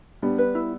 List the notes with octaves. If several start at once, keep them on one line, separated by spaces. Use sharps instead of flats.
G3 B3 D4
B4
E4